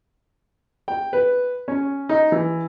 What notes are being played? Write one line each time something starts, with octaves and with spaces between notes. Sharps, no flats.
G5
B4
C#4
D#4
E3